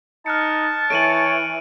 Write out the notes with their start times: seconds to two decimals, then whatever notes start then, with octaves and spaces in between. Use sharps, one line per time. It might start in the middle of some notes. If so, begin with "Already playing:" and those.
0.26 D#4 A5 F6 F#6 C#7
0.90 E3 C#5 D7 D#7 F#7